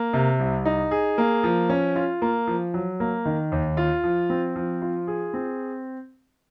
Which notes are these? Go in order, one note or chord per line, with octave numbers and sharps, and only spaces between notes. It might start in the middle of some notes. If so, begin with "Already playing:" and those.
Already playing: A#3
C3
C2
D#4
G#4
A#3
F3
C#4
F4
A#3
F3
F#3
A#3
D#3
D#2
F4
F3
C4
F3
F4
G#4
C4